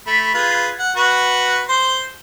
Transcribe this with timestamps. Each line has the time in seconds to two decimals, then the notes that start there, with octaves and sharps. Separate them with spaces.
0.07 A3 B5
0.34 F4 G#4 B4
0.79 F#5
0.96 F#4 B4
1.69 C5 C6